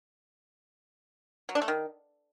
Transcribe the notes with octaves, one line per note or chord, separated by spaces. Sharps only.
F#3
D4
A3
D#3